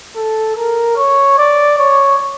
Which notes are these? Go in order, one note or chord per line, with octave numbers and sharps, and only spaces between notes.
A4
A#4
C#5
D5
C#5